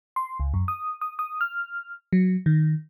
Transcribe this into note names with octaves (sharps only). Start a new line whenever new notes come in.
C6
C#2
F#2
D#6
D#6
D#6
F6
F#3
D#3